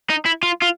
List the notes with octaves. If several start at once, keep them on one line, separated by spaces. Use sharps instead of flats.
D#4
E4
F4
F4